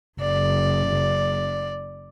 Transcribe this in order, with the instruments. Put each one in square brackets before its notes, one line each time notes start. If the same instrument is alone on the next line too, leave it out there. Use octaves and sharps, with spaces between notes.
[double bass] F#1 [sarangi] D5